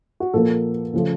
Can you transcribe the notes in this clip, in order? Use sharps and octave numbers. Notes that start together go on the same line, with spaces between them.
F#4
A#2 F3 A#3 A4
C#3 F3 A3